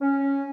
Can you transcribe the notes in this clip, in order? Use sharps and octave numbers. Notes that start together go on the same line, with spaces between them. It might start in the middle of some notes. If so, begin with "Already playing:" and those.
C#4